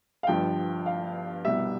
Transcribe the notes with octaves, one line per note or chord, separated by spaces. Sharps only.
F5
G1 G2 F3 G5
F5
C2 B2 G3 E5